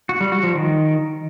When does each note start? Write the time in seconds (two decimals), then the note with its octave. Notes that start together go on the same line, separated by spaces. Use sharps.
0.09 F#4
0.21 G3
0.32 F#4
0.43 F3
0.55 D#3